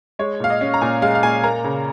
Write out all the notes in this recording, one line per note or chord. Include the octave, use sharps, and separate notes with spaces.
G#3 C#5
A#2 F5
D#5
C#4
A#5
A#2 G#5
G#3 F5
F5
A#2 G#5
A#3 A#5
C#3